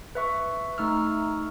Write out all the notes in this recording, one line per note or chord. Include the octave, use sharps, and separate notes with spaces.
B4 E5 C#6
A3 D#4 C#6 E6 F6